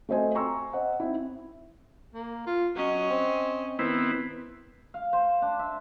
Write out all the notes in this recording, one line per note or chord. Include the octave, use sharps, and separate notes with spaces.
A3 C4 F#4 C5 D#5 G#5
G5 G#5 A#5 C6 C#6 E6
C5 D#5 F#5
C4 D#4 E4
A#3
F4
F#3 C#4 D#5
C4
D#3 B3 C4 E4
F5
C5
D4
E5